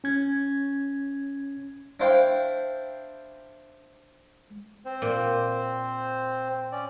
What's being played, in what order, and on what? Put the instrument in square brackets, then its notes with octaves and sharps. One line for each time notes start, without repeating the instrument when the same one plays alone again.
[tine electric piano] C#4 G#6
[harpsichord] D4 E4 C5 F5 G5
[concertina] C4 C5
[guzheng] A#2
[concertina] C#4 D5